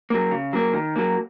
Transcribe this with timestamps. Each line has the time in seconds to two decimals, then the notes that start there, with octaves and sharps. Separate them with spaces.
0.10 F#3 A#3
0.31 C#3
0.53 F#3 A#3
0.74 D#3
0.96 F#3 A#3